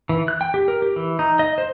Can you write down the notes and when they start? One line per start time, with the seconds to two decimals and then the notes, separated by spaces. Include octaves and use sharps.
0.09 E3
0.28 F#6
0.41 G5
0.54 G4
0.68 A#4
0.82 G4
0.96 E3
1.19 D#4
1.39 D#5
1.58 C5